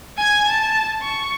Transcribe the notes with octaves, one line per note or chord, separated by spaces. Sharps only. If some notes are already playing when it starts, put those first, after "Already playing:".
G#5 G#6
A5
C#6